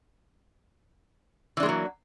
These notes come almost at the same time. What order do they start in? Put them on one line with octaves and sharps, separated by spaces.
E3 D4 G#3 A#3 F#3